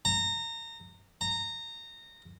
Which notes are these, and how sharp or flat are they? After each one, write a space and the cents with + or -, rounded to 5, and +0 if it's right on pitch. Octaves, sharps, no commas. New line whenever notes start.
A#5 -25
A#5 -20